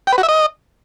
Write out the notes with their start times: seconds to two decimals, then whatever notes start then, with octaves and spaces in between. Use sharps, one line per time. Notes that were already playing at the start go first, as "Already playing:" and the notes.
0.07 G5
0.13 B4
0.18 F#4
0.23 E5
0.29 D#5